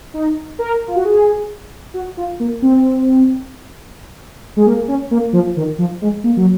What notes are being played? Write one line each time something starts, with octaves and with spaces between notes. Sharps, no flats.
D#4
A#4
F4
F#4
G#4
F#4
F4
A#3
C4
G#3
A#3
C#4
A#3
F3
D#3
F3
G#3
A#3
F#3